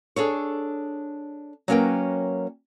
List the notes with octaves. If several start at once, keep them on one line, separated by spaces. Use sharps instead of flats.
D4 G#4 A4 C#5
F#3 A#3 C#4 A#4 B4 G5